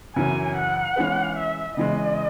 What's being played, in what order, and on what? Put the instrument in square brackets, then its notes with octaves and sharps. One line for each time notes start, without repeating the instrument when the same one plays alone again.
[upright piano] F#2 C#3 E3 [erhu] G#5
[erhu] F#5
[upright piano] E3 G#3 C#4 G#4 B4
[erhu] E5
[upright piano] C#3 E3 G#3 [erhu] D#5